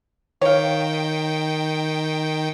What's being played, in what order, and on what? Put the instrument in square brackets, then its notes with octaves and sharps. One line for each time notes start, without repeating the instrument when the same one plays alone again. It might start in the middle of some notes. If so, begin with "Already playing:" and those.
[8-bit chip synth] D#3 G5 [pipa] C#5 F5